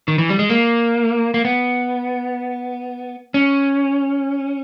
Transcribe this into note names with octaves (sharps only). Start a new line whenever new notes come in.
D#3
E3
G3
G#3
A#3
A#3
B3
C#4